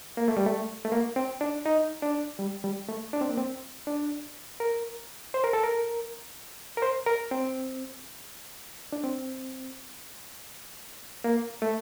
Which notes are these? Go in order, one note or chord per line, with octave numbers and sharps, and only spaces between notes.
A#3
A3
G3
A3
A3
A#3
C4
D4
D#4
D4
G3
G3
A3
D4
C4
A#3
C4
D4
A#4
C5
A#4
A4
A#4
A#4
C5
A#4
C4
D4
C4
A#3
A3